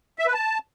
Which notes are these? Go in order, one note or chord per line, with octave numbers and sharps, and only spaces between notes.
E5
B4
A5